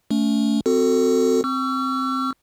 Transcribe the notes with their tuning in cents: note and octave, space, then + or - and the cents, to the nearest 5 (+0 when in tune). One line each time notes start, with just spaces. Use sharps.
A3 +0 C#4 +35
C4 -15 F#4 +0 A4 +25
C4 +0 C#6 +35 E6 +40